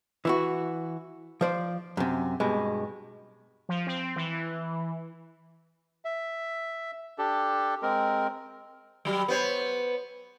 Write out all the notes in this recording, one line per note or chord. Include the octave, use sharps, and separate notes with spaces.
E3 E4 F#4
F3 C5 D5
F#2 C3
G2 B2 G#3
F3
C4
E3
E5
D4 G4 A4
G#3 C4 A#4
F#3 G3
B3 C5 C#5